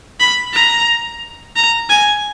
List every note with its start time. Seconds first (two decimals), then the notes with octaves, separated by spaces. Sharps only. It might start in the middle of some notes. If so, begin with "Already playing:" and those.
0.20 B5
0.53 A#5
1.56 A#5
1.89 G#5